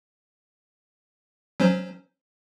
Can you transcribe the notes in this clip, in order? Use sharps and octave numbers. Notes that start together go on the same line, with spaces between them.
F#3 C#4 C5